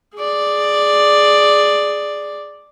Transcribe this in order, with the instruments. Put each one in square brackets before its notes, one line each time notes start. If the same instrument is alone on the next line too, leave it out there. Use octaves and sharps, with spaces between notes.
[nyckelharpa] G#4 D5